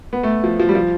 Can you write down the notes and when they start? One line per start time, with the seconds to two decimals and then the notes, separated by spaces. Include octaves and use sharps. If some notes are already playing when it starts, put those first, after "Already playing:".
0.13 B3
0.23 A3
0.44 F3
0.59 F3
0.69 G3
0.75 F3